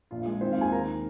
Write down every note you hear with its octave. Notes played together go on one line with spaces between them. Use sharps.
A#1 F4
G#3 F4
D#3 C4 C5
F4 F5
D#2 G#4 G#5
D#3 A#4 A#5